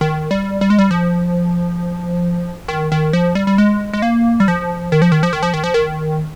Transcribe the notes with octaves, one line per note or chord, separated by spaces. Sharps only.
D#3
G3
G3
G#3
G3
F3
D#3
D#3
F3
G3
G3
G#3
G#3
A#3
G3
F3
D#3
F3
D#3
F3
D#3
F3
D#3
F3
D#3